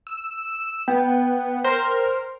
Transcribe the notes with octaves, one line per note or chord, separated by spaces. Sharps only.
E6
B3 G5
A#4 C5